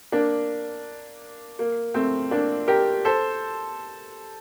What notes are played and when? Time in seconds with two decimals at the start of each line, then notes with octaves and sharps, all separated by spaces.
0.12 A#3 D4
1.59 A#3
1.94 A3 C4
2.31 A#3 D4
2.68 G4 A#4
3.05 A4 C5